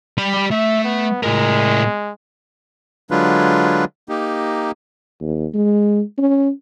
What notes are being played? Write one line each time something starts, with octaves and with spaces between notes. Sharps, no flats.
G3 B5
A3 E5
B3
A2 G#3 A#4
D3 F#3 G#3 D4 F4 B4
A#3 D#4 G4
D#2
G#3
C#4